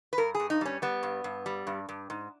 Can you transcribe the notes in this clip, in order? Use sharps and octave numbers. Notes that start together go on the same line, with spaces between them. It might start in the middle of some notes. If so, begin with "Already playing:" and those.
B4
G2 A#4
G#4
G2
D#4
G3 C#4
G3 B3
G2
G2
G3
G2
G2
G#2